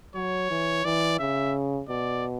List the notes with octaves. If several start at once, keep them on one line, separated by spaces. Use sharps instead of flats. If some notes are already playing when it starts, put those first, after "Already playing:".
F#3 C#5
E3
E3 D5
C#3 E5
B2 D5